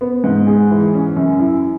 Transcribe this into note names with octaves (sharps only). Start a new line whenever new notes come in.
B3
G#2
G#4
E3
C#4
F#2
E4